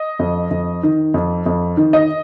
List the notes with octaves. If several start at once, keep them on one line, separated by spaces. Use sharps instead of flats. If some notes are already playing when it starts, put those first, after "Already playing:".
Already playing: D#5
F2
F2
D#3
F2
F2
D#3
D#5